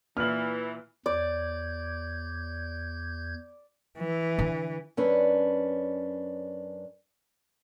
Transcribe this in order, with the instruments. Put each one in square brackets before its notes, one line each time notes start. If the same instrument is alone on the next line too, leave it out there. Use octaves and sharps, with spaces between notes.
[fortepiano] A#2 [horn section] E3 [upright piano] F6 F#7
[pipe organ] E2 G6 G#6 [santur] D5
[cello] E3
[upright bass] D3
[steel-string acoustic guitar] F#2 C#4 D4 B4